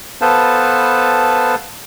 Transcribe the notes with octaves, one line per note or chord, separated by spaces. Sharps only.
B3 A4 B4 C5 F5 A5